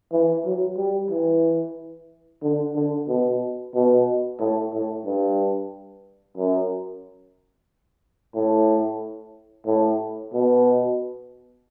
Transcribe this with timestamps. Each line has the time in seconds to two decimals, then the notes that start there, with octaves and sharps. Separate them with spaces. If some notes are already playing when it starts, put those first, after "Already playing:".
0.12 E3
0.45 F#3
0.77 G3
1.10 E3
2.42 D3
2.76 D3
3.08 B2
3.74 B2
4.39 A2
4.73 A2
5.05 G2
6.37 F#2
8.35 A2
9.67 A2
10.33 B2